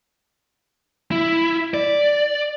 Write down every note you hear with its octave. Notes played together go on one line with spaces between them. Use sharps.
E4
D5